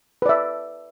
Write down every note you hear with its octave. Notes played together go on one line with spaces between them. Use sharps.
B4 D5 E5